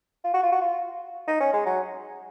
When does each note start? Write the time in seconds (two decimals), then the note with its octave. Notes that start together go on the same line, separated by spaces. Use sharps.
0.24 F4
0.34 F#4
0.43 F4
0.52 F#4
0.61 F4
1.28 D#4
1.40 C#4
1.53 G#3
1.66 F#3